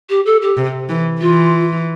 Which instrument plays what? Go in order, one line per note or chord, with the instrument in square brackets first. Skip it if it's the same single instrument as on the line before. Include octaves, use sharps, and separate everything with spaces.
[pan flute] G4
A4
G4
[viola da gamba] C3
E3
[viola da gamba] E3 [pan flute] F4